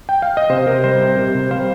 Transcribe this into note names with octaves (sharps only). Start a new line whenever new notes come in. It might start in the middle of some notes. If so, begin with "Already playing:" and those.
G5
F5
D#5
C3 C5
C3 A#4
G3 C5
C3
C3
C3
G3 C5 F5